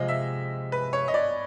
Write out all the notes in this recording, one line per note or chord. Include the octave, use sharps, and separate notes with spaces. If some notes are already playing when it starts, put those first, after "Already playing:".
Already playing: C3 F3 G#3 D#5
E5
B4
C#5
D#5
D5